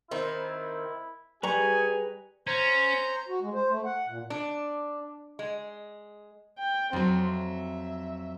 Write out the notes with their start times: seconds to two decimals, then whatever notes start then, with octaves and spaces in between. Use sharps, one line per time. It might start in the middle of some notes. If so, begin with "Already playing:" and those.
0.11 D#3 C4 E4
1.43 G3 G4 G#4 B4 G#5 A#5 C#6
2.47 C#4 C5 A#5
3.28 F#4
3.41 G#3
3.54 C5
3.70 A3
3.85 F#5
4.08 A#2
4.30 D4
5.39 G#3
6.59 G5
6.93 F2 F#3 C4
7.32 E5